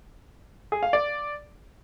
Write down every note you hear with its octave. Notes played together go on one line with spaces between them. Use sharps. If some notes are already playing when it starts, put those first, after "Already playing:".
G#4
F5
D5